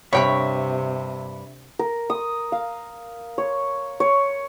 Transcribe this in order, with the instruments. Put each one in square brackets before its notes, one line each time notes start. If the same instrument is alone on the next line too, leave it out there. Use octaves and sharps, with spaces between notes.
[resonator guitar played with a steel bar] G2 [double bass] C3 [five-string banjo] C#5 G5 B5 [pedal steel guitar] E5 C#6
[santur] A#4
D#6
F5
C#5
C#5